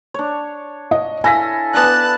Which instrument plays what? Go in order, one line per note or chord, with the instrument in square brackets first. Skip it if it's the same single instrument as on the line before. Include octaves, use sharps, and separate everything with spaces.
[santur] D4 C#5
[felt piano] D#5
[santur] E4 A4 F5 [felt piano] G#5 A#6 B6
[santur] B3 D4 [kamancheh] A5 F#6